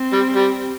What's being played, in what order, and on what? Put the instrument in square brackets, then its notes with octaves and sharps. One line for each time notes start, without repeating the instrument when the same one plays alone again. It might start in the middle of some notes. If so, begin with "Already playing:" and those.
Already playing: [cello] C4
[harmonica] G3
G3